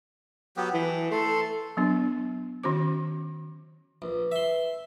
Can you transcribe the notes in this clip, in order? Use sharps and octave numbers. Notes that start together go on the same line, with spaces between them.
F#3 B3 G4
E3 A4
A3 A4 C6
F#3 B3 D4
D#3 C#4 F#4 C5 D6
A#1 B4
E5 C6